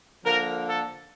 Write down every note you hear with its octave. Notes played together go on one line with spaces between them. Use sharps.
D3 F3 A#3 A#4
A4